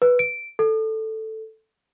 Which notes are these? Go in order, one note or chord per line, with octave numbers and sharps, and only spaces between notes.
B4
D7
A4